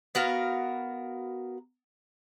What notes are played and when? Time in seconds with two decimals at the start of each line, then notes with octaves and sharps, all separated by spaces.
0.15 B3 F#4 A#4 F5